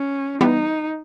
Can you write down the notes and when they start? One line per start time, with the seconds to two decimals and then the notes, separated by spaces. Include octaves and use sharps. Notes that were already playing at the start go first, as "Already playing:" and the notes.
Already playing: C#4
0.41 E3 G3 B3 D#4